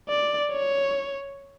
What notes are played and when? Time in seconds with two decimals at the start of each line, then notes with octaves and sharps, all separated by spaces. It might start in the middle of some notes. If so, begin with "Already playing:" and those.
0.09 D5
0.52 C#5